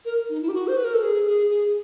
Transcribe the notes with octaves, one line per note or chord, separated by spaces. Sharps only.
A#4
D#4
E4
G4
F#4
C5
B4
A#4
A4
G#4
G#4
G#4